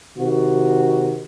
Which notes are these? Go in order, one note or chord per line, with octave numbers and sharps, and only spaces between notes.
C3 D#3 F#4